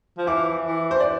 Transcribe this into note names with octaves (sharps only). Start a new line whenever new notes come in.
F3
E3 D6
E3
C5
D5